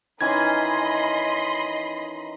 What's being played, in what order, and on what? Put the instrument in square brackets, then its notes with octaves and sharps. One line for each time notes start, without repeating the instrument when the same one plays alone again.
[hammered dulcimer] D#3 E3 C#4 [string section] D#5 B5 C6 [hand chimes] G#6